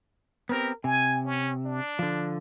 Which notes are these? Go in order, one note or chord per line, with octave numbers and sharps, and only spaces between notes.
B3 C4 G4 A#4
C3 G#5
C#4
D4
D3 F3